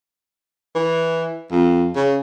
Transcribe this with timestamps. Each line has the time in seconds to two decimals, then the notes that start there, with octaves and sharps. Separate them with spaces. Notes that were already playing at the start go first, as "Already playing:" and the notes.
0.75 E3
1.51 F2
1.96 C#3